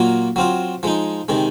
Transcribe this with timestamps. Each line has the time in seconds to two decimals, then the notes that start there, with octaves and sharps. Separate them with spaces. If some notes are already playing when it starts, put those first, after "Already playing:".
Already playing: A#2 F#3 A#3 F4
0.36 F#3 C4 F4
0.83 F3 G#3 D#4
1.28 C3 D#3 G#3